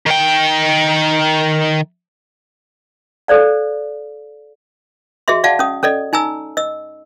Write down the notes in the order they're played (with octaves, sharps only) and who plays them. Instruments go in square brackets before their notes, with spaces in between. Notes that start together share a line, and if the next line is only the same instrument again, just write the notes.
[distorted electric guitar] D#3 G5
[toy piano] A4 C5 D5 F5
F#4 G#4 D#5 E5 C6
D5 F5 F#5 A5
C#4 D#6
C#4 A4 D5 D#5
D#4 G#5 A#5 E6
D#5 E6